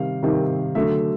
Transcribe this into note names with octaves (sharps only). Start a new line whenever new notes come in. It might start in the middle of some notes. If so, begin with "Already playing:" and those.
Already playing: C3 D#3 G3 F5
C3 D#3 G3
D3 F#3 A3 E5